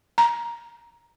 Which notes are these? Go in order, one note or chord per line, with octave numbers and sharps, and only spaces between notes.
A#5